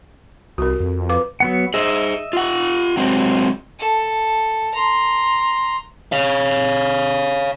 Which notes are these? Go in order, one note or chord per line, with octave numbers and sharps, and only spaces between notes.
C2 F#4 A#4
F2
B4 F5 D6
F#3 B3 F#5
G#4 C5 D#5 E5
F4 F#5
F#3 G#3 C4
A4
A#5 C6
C#5 F5